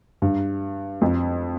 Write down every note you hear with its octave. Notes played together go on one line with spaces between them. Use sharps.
G2
F2